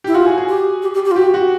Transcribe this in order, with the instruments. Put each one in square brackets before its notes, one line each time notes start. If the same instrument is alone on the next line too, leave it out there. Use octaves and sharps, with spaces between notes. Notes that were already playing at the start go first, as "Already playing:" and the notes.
[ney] E4 [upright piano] G4
[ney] F4 [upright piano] F#4
[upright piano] G#4
G#4
[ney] G4
G4
G4
G4
F4
[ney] F#4 [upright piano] G4
[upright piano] F#4